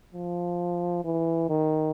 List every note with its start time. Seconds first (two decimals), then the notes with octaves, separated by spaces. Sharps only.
0.13 F3
1.04 E3
1.49 D#3